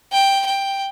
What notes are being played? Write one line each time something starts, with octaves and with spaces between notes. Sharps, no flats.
G5
G5